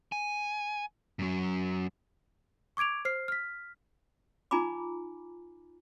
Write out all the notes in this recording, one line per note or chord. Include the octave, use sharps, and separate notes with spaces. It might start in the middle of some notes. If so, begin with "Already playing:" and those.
G#5
F#2 F#3
C#6 D6 G#6 D7 F7
C5 F6 C7
F6 B6
D#4 F4 G#5 A#5 B5 D6